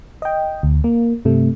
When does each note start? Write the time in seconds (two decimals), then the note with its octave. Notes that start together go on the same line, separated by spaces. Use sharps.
0.22 D#5 G5
0.63 D2
0.84 A#3
1.25 G2 C3 A3